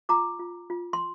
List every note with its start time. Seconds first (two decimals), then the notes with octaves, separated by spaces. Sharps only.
0.09 F4 A#5 D6
0.39 F4
0.70 F4
0.93 C6